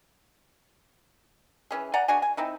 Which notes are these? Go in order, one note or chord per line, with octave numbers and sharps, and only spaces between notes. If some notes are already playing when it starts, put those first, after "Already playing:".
E3 C#4 G#4
D5 F#5 G#5 A#5
D4 F#4 G#4 G#5
G#5
C4 D#4 E4